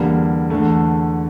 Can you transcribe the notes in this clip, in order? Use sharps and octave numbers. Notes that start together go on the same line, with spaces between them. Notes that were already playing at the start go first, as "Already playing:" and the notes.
Already playing: E2 D3 G3 A#3
E2 D3 A3